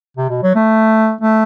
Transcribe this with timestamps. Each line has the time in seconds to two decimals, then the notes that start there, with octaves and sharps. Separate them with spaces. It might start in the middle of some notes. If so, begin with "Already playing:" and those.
0.17 C3
0.30 B2
0.43 F#3
0.55 A3
1.21 A3